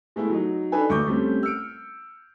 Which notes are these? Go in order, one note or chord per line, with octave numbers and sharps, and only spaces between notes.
G#3 A3 B3 E4
F#3 D#4
D4 D#4 A4 B4 G#5
D2 C#6 D6 G6
G3 A3 C4 C#4
E6 F6 C#7 D7